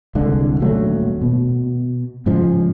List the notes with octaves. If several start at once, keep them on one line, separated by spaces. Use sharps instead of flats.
C2 D3 G#3 D4
D#1 D#2 F#3 A3
B2
G#2 C#3 F3 G#3